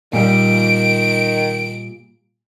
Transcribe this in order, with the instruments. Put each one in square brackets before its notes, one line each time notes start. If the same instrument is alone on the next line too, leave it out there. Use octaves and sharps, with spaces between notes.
[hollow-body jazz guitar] A#2 G3 [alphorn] D#3 [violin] D7